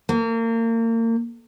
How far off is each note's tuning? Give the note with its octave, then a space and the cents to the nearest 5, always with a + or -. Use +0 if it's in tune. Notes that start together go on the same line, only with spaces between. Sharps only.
A#3 -35